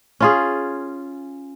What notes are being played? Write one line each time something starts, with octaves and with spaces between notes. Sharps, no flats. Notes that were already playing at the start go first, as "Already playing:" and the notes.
C#4 F4 G#4